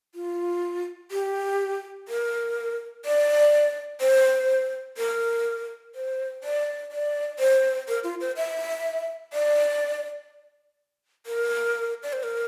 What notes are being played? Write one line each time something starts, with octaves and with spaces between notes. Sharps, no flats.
F4
G4
A#4
D5
C5
A#4
C5
D5
D5
C5
A#4
F4
C5
E5
D5
A#4
D5
C5
A#4